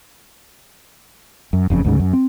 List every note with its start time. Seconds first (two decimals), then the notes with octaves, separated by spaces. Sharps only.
1.53 F#2
1.70 F#1 F2 C#3
1.85 D2 G#2 C#3
2.00 F#2
2.13 C4